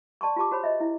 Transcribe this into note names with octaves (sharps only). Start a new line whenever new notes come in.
D5 A5 C6 C#6
F4 G4 A5 D6
F#4 C5 C#5 B5
D#5 E5
E4 E5